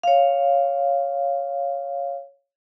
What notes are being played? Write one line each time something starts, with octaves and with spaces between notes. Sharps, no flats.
C#5 F5